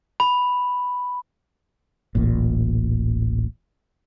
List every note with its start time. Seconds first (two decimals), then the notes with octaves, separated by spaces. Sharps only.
0.20 B5
2.15 D1 A1 A#2